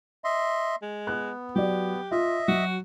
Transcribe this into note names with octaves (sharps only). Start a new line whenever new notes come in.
D#5 E5 C6
G#3
B3 F#6
F#3 G4 D5
F4 D#5 E5
F#3 F#4